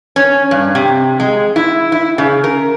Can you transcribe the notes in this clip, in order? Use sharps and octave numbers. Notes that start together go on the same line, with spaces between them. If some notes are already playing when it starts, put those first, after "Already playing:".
C#4
G2
C3
G#3
E4
E4
C#3
A#4